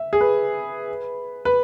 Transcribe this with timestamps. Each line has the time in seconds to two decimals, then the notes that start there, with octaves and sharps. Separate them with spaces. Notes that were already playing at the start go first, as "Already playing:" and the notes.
Already playing: E5
0.13 G#4
0.21 B4
1.45 B4